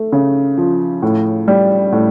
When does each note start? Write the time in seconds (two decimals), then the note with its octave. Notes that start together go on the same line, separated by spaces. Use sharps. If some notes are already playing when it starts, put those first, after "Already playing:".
Already playing: A3
0.12 C#3
0.58 F3
1.02 A2
1.48 G3
1.92 A2